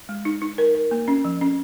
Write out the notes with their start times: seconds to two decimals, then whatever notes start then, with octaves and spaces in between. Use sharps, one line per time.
0.09 G#3
0.25 D#4
0.42 D#4
0.58 A#4
0.75 A#4
0.91 A#3
1.08 C#4
1.25 F3
1.41 C#4